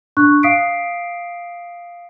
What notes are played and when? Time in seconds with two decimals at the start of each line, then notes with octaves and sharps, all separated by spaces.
0.17 D4 C#6 F#6
0.43 F5 D#6 B6 C7 D7